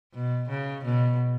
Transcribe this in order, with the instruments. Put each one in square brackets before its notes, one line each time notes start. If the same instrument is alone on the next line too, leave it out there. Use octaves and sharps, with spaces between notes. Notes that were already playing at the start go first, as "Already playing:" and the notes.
[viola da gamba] B2
C#3
B2